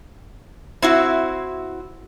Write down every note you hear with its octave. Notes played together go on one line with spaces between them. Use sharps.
C4 E4 F#4